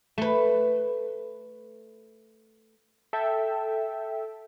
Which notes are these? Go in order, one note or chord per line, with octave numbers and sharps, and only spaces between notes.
A3 B4
A4 E5 G5